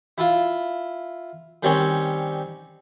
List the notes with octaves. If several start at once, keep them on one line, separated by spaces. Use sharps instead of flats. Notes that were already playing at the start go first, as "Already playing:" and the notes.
E4 F4
D#3 G3 C4 C#4 C#5